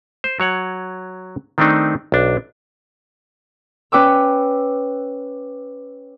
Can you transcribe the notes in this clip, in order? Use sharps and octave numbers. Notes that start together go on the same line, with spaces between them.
C5
F#3 C#5 F#5
D#3 A3 C4 D4 D#4
B1 D4
C#4 B4 G5 D6 E6